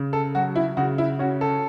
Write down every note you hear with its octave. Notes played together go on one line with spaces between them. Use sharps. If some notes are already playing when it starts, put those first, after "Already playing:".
Already playing: C#3
A4
F#3 F#4
E4
C#3 F#4
E4
C#4 F#4
A4